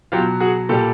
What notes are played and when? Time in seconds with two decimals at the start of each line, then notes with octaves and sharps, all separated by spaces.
0.12 F#3 F4 G4
0.17 B2
0.40 F#4 G#4
0.69 A#2 G3 G4 A4